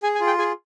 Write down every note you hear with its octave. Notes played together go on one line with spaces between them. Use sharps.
G#4 G#5
G#5
F4
G5
G#4 G#5